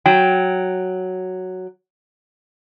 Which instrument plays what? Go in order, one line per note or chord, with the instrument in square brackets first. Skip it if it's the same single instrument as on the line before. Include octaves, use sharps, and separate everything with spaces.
[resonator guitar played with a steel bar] F#3 G5